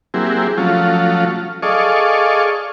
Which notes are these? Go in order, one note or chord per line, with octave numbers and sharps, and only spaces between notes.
F#3 A#3 C4 E4 G4 G#4
F3 F#3 A3 C#4 F4
G#4 A4 D5 D#5 F5 C#6